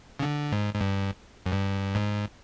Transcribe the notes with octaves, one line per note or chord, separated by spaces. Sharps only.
C#3
D3
G#2
G#2
G2
F#2
G2
G#2